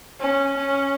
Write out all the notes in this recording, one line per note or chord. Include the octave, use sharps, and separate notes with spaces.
C#4
C#4